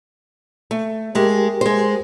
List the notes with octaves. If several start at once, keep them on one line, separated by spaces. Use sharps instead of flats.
A3
G#3 A3 G4 A#4
G#3 C5